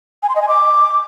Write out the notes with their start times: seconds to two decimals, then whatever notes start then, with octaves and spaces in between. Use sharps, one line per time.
0.23 G#5
0.29 C6
0.36 D#5
0.42 G#5
0.48 D6